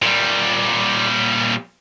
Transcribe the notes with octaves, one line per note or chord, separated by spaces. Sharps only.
A#2 G3